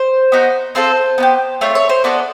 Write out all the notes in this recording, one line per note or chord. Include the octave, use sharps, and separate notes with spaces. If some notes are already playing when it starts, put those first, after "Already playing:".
Already playing: C5
B3 D#4 F#4
C4 F4 A4 C5
B3 D#4 G4
A3 C4 F4 C#5
C#5
C5
B3 D4 F#4 A4 D5